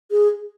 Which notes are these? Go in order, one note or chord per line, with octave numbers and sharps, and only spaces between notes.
G#4